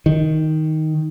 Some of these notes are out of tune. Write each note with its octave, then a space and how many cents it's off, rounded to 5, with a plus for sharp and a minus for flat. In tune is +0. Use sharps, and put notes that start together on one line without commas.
D#3 +10